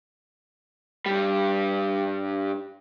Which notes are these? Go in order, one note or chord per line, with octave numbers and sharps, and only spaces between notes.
G2 G3